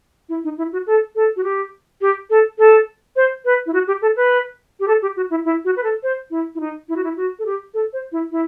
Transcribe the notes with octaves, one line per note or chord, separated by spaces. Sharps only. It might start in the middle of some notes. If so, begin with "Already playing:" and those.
E4
D#4
E4
F#4
A4
A4
F#4
G4
G4
A4
A4
C5
B4
E4
F#4
G4
A4
B4
G4
A4
G4
F#4
E4
E4
F#4
B4
A4
C5
E4
E4
D#4
E4
F#4
E4
F#4
A4
G4
A4
C5
E4
E4